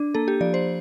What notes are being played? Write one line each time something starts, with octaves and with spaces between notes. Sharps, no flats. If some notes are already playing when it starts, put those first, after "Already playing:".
Already playing: D4
A#3 A4
G4
F3 D5
C5